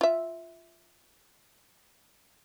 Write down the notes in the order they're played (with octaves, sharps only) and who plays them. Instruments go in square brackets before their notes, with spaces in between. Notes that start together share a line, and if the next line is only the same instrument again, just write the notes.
[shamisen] F4 E5